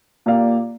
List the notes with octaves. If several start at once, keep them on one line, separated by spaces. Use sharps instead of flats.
A#2 A#3 G4 D5 F5